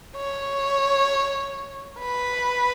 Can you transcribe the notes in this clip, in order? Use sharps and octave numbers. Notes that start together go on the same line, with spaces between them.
C#5
B4